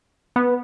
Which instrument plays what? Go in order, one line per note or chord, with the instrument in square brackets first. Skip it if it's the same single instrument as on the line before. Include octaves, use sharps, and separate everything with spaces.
[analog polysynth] B3